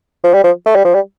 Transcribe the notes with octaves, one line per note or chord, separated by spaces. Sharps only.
F3
G3
F3
A3
G3
F3
G3